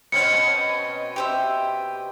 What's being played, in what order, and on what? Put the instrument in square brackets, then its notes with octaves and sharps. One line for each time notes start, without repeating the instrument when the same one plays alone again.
[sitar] B2 C4 C#4 [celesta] C#7
[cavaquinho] G4 C5 E5